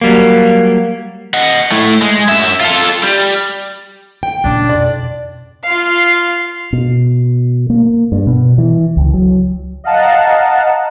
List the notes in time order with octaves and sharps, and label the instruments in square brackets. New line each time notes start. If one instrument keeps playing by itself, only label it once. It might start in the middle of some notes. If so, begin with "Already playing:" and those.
[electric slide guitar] F#3 G3 A#3
[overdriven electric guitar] D#5 F#5
A2 A3
G#3
F#2 E5
F4 A4
G3
[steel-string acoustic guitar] G5
[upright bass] A#2 C#3 [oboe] D4
[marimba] F2 B2 [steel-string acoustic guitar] D5
[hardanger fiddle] F4 F5
[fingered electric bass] B2
A#3
G2
B2
E3
C#2
F#3
[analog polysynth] D#5 F5 F#5 A5 A#5